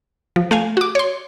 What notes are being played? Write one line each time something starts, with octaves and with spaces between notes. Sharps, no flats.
F3
A3 F5 G#5
F#4 D6
C#5 C6